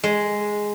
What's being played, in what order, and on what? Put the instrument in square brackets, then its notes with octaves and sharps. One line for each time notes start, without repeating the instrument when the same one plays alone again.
[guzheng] G#3